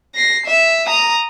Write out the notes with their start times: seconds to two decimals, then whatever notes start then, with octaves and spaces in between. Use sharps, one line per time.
0.15 A#6 C7
0.47 E5
0.86 A#5 D#6